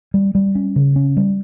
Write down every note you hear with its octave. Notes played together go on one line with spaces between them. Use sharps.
G3
G3
C#4
C#3
C#4
G3